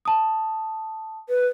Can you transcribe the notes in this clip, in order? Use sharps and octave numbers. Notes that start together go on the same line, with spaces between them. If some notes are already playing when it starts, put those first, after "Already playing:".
A5 D#6
B4